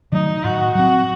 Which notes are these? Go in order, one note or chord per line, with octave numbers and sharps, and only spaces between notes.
D#3 F#3 A3 D#4
A2 F#4
F#3 C4 F#4